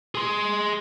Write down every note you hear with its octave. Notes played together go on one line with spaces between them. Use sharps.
G#4 C6